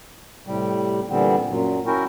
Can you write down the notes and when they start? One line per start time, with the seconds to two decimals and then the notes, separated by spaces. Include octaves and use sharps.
0.47 A2 C3 G3
1.09 A#2 D3 E3 G3 B3 C4
1.49 F#2 A#2 F#3
1.86 C#4 E4 F#4 A#4 G5